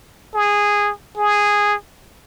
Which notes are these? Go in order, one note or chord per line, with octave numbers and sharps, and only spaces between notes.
G#4
G#4